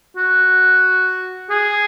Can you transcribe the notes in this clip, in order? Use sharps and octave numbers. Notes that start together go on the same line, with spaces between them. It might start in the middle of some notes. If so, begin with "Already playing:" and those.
F#4
G#4